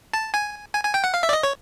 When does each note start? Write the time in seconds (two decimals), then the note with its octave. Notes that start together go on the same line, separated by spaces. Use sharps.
0.13 A5
0.34 G#5
0.74 G#5
0.84 G#5
0.94 G5
1.04 F#5
1.14 F5
1.23 E5
1.29 D5
1.33 D#5
1.43 C#5